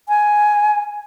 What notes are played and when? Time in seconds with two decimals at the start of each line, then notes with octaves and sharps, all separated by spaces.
0.09 G#5